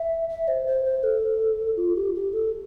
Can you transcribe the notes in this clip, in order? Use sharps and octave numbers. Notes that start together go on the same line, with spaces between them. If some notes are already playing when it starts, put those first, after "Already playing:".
Already playing: E5
E5
C5
C5
C5
A4
F4
G4
G4
A4